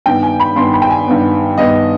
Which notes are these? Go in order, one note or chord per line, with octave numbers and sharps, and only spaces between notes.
G2 D#3 B3 G5
G#5
B5
G2 D#3 B3 C6
B5
G5
G#5
G2 D#3 B3
G2 D#3 B3 D#5